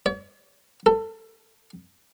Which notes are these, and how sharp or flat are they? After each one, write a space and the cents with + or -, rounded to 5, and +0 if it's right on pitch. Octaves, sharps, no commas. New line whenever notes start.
C#5 +45
A4 +20